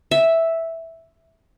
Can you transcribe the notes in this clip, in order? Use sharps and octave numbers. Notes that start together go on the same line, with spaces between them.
E5